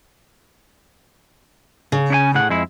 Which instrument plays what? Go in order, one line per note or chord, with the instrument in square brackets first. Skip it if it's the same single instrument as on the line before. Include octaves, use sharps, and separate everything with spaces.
[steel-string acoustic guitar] C#3
[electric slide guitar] C#4 D4 G#5
A2 G#4 F#5
F2 G#3 E4